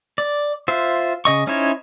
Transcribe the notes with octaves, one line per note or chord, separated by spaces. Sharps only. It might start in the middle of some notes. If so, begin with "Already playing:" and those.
D5
F4 C5 E5
C#3 D#5 C#6
C#4 D#4 E4 C5 C#5